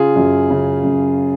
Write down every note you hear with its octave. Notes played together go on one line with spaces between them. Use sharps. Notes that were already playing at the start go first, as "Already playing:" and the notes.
Already playing: C#3 F4 G#4
F#2
C#3
F#2